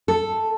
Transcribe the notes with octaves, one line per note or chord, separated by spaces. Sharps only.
A4